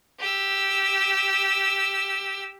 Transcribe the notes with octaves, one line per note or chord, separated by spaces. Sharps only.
G4 E6